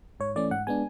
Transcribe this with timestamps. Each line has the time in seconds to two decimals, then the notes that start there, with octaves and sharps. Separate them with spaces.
0.20 G#2 C#5
0.36 E3 A3 C#4 D5
0.51 G#2 F#5
0.67 G#3 B3 D4 G#5